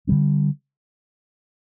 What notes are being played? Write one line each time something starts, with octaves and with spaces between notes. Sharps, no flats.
D3 G3 C4